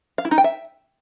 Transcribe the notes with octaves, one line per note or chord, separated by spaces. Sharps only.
F5
E4
D#4
G5
E5